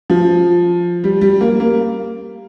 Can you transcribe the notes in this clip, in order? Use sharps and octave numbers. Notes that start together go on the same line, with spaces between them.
F3
G3
G3
A#3
A#3